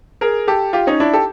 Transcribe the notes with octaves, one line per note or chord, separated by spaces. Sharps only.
G#4 A#4
G4 A4
F4 G4
C#4 D#4
D4 E4
G4 A4